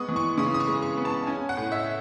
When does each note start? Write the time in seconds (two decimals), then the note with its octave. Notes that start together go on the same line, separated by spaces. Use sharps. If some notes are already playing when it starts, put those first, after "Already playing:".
Already playing: G#3 B3 C#6 D#6
0.09 E3
0.16 C#6
0.38 C#3 D#6
0.54 D#6
0.60 C#6
0.68 G#3
0.82 C#6
0.97 B3
1.05 A5
1.27 C#4 G#5
1.49 F#5
1.57 A2
1.72 E5